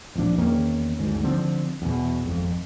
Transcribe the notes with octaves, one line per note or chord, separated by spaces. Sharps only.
D1 A#1 F3 D4
E2 D#3 A#3 C#4
G1 D2 G#2
D3 F3 C4
E2 B2
G#1 F2